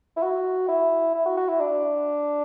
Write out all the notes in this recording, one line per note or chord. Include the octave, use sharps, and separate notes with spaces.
E4
F#4
E4
E4
F#4
F#4
E4
D4